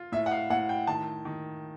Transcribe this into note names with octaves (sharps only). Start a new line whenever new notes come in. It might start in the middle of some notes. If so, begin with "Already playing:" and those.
Already playing: F4
A2 E5
F#5
F5
A2 F#5
G5
D#3 A5
D#3